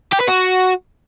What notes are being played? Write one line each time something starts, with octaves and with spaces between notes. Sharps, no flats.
G4
B4
F#4